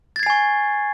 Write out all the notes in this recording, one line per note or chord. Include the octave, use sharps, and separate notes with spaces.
G#5 C#6 G#6 A6 C7